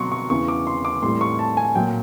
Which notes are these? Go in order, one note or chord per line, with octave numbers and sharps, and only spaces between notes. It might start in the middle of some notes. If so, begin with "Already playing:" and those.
Already playing: B2 F#3 C6 C#6
C#6
E2 C#3 E3 C#6
D6
C6
D6
A2 E3 G3 C6
C#6
A5
G#5
A#2 F#3 G5